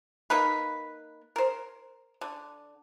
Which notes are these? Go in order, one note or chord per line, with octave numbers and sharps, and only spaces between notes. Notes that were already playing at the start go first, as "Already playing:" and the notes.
A#3 D#4 A#4 B4
A#4 C5
D3